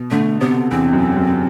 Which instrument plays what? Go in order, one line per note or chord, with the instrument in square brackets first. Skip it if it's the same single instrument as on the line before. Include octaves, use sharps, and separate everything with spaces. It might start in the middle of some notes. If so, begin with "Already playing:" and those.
Already playing: [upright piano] B2
[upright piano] D3 [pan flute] A3
[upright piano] C3 [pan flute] B3
[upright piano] E2 [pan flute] C4
[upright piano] F#2
F#2